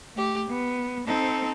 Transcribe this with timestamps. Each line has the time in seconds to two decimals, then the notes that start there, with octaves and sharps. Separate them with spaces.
0.15 A3 G4
0.48 B3
1.07 C4 D#4 A4